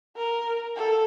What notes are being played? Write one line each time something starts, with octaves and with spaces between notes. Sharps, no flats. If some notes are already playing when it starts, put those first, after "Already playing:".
A#4
A4